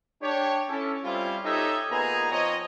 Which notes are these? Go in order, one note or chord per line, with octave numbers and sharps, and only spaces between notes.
D4 G4 C#5
C#4 E4 A4
G3 C4 C#4 E4 F4
D#4 G4 A4 C#5 D#5 E5
A#2 B3 D#4 G#4 G#5 A#5
F3 C4 C#5 D#5